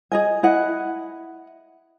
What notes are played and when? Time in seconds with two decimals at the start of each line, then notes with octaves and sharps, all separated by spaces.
0.12 G#4 D#5 G#5
0.43 E4 D#5 F#5